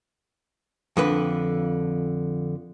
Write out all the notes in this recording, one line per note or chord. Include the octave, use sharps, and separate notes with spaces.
F2 D3 B4